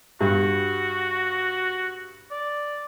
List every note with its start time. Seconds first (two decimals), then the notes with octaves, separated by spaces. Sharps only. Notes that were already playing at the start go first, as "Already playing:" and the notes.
0.21 G2 F#4
2.31 D5